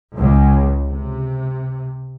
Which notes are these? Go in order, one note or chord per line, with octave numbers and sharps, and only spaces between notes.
C#2
C3